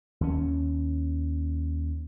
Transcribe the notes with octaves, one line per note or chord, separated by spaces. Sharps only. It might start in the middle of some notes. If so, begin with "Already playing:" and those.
D#2 C#4